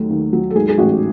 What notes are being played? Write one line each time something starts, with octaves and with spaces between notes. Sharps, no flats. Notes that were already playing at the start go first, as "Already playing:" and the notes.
Already playing: D#2 D#3 F#3 A3
D#2
F#3
A4
G#2 G#4
G#4
A1 F#4